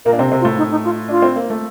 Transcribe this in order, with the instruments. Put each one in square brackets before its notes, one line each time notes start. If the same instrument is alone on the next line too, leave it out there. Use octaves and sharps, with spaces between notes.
[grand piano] A#2 A#3 [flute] A#4
[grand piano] D4
C3 C4
C3 C4
[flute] F4
[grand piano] A2 A3
[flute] D#4
D#4
F4
[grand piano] D4 [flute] F4
[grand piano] C4
A#3
A3